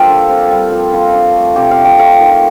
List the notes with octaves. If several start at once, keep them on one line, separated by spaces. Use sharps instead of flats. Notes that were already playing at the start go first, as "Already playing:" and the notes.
Already playing: G3 A#3 D4 F4 G4 A4 C5
D3
C4
G3
F3
F4
D4
A3
C3 G4
F5
D4
G5
A3 F5
D#3